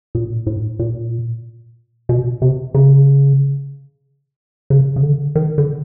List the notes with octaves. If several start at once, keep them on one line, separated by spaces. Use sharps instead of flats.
A#2
A2
A#2
B2
C3
C#3
C#3
C#3
D3
D#3
D3